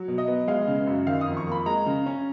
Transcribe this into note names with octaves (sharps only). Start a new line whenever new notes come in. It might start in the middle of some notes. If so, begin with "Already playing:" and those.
Already playing: F#3
B2
D#5
B3
G#3 F5
C#3
F#2
D#3 F5
D#6
F2
C#6
A#3 B5
G#3 A#5
C#3
C#4